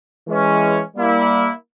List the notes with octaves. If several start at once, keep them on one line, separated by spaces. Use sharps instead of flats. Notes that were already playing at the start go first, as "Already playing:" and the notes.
E3 G#3 C#4
G3 A#3 E4